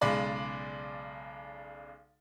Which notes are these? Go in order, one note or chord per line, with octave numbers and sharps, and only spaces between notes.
B1 C#3 G#3 D5 B5